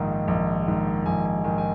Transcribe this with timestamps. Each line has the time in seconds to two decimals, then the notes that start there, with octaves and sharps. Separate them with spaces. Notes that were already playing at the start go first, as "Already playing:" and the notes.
Already playing: A#1 G#2 D#3 F5
0.28 A#1
0.67 G#2 D#3
1.06 A#1 G#5
1.25 G#5
1.44 G#2 D#3 G#5
1.58 G#5